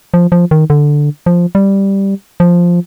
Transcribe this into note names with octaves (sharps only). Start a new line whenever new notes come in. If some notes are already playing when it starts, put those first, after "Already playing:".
F3
F3
D#3
D3
F3
G3
F3